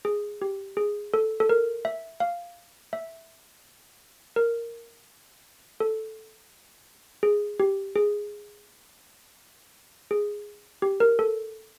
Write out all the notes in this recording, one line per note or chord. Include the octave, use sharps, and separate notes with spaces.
G#4
G4
G#4
A4
A4
A#4
E5
F5
E5
A#4
A4
G#4
G4
G#4
G#4
G4
A#4
A4